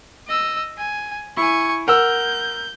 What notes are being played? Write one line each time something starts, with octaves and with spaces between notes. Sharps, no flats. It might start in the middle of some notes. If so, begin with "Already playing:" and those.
D#5 E6
G#5
E4 G#5 C#6
A#4 F#5 E6 G6